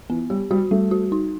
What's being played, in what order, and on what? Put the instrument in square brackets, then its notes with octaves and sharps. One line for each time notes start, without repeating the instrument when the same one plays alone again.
[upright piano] E3 [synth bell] B3
[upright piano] G3 [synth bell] G4
[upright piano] G3 [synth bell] F#4
[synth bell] G3 [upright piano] A3
[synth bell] F#4
D#4